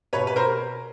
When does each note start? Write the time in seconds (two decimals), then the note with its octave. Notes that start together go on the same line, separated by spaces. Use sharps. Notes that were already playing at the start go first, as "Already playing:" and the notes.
0.13 B2 B4 C#5
0.27 B4
0.36 A#4 C5